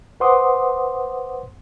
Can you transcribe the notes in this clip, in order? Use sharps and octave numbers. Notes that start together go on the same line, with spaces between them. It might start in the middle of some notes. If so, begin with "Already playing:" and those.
B4 C5 F#5 C6 D6 D#6